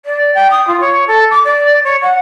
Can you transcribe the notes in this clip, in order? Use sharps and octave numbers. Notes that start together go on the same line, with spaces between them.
D5
G5
D#6
F4
C#5
A4
D6
D5
C#5
F#5